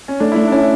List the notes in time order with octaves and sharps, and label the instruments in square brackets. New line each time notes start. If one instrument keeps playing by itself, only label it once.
[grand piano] C#4
[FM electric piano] A3 [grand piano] D4
[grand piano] E4
[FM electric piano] A3 [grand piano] D4
[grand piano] D4
[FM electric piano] C#4 [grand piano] E4